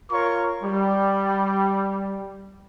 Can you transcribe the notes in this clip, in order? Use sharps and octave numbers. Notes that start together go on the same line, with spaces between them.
F4 A#4 C#5 C#6
G3